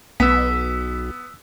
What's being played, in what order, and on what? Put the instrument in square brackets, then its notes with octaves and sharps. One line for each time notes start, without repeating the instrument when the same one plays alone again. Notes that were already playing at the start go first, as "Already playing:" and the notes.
[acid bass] B1 [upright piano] B3 [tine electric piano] E6 B6